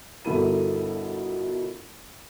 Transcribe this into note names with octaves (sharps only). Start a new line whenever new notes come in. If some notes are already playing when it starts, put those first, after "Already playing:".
G1 B2 E4 A4 A#4 D#7